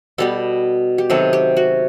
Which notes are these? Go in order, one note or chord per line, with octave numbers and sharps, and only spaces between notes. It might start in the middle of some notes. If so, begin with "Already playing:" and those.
B2 G3 B3 A4
G4
C3 D#3 F#3 B3 A4
G4
F#4